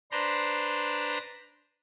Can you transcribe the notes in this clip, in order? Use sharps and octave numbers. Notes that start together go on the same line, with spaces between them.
D4 B4 C5 A#5 C6